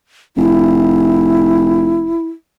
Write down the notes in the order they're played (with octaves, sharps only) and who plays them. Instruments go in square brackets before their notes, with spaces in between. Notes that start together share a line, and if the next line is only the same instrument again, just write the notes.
[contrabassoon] F1 [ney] E4